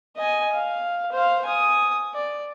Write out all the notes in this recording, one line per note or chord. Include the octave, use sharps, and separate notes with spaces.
D#5 G#5
F5
C5 F5
G#5 D#6
D5